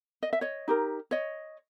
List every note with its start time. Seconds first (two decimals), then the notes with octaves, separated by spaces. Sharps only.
0.23 D#5
0.33 E5
0.41 C#5 D#5
0.68 D#4 G4 A#4
1.11 C#5 D#5